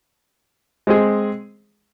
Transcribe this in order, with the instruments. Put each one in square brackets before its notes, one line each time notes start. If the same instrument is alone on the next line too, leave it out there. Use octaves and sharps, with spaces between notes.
[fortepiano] G#3 C4 G#4